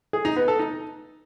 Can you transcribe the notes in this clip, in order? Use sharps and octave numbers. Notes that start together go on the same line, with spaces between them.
G#4
D#4
B3
A4
D#4